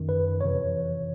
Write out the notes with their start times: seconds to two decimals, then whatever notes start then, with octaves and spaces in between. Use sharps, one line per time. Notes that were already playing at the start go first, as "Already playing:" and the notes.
Already playing: F#2 D#3
0.09 B4
0.41 F2 C3 E3 C#5